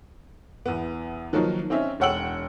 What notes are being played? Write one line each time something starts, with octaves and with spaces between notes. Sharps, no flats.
E2 B3
D#3 F3 F#3 A#3 D#4
C4 C#4 D#4 E5
E1 C#5 F#5 G5 E6 F#7